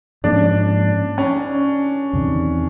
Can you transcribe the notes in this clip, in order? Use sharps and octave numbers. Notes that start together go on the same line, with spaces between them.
G#2 F3 A#3 C#4 D4
C#4
E2 C3 D#3